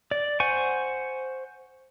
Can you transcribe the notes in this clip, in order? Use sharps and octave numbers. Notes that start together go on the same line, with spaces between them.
D5
C5 F#5 G#5 C#6